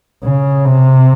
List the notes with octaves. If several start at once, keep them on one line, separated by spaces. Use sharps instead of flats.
C#3
C3